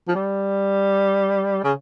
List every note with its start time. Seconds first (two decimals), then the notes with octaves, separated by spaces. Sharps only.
0.08 F3
0.15 G3
1.64 C#3